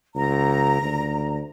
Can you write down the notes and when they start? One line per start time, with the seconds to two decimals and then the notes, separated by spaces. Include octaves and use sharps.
0.15 C#2 A#5
0.82 D2